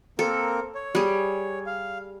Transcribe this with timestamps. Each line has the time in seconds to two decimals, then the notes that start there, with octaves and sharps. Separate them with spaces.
0.19 A#3 C4 A4 A#4
0.75 C#5
0.95 G3 G#4
1.66 F5